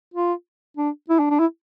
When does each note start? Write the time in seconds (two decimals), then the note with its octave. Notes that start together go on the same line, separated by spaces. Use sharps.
0.14 F4
0.77 D4
1.10 E4
1.19 D4
1.30 D4
1.39 E4